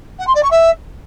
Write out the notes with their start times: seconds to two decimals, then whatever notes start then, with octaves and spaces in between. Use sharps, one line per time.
0.19 F#5
0.27 C6
0.35 D5
0.43 C#6
0.51 E5